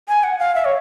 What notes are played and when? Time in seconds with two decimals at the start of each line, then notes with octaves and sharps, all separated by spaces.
0.08 G#5
0.23 F#5
0.39 F5
0.55 E5
0.65 C#5